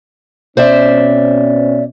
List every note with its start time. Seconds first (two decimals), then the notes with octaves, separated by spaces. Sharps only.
0.57 B2 C4 C#4 C5 D5 E5